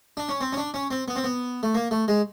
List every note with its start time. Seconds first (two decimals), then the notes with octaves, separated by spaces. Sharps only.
0.17 D4
0.29 C#4
0.41 C4
0.53 C#4
0.57 D4
0.74 C#4
0.90 C4
1.08 B3
1.16 C4
1.24 B3
1.63 A3
1.74 A#3
1.91 A3
2.08 G#3